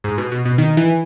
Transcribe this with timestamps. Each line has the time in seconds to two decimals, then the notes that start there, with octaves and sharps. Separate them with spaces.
0.04 G#2
0.18 B2
0.32 B2
0.45 B2
0.58 D#3
0.77 E3